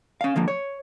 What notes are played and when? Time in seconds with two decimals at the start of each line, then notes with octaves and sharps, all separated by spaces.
0.21 C#4 F5
0.36 D3 F3 A#3
0.48 C#5